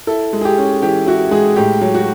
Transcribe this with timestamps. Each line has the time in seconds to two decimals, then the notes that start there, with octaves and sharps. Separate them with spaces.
0.07 E4 A4
0.33 G#3
0.41 G#4
0.45 G4
0.58 C#4
0.82 E3 G4
1.07 E4 F#4
1.31 G#3 G#4
1.56 A2 G4
1.81 F#3
1.94 F#4